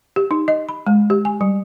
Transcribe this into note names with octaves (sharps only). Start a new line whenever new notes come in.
G4
D#4
D#5
B5
G#3
G4
G#5
G3